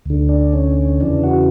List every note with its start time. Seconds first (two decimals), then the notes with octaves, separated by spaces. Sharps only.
0.05 D2 D3
0.29 D4
0.53 C#4
1.00 E2 C#3 E3 D4
1.24 F#4